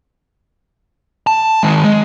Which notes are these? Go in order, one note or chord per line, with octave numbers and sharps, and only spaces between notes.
A5
D#3 G#3
G#3